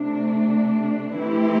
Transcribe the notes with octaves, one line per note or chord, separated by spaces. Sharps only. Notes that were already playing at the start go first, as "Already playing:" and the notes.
Already playing: C3 A3 D4
E3 A3 C4 E4 G4